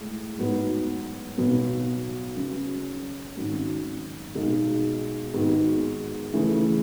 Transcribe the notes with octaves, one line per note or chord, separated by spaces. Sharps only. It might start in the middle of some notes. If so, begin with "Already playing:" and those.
Already playing: A2 G#3
G#2 F#3 B3
B1 B2 F#3 B3
C#3 F#3 C#4
G#1 G#2 F#3 C#4
B1 B2 G#3 D#4
G#2 D#3 G#3 B3 F#4
C#3 E3 A3 E4 G#4